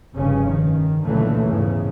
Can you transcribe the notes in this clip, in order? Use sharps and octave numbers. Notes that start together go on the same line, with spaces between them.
F1 G2 C#3 C#4
D#3
C#2 A#2 D3 E3 F#3 A3
E2 G#2 C#3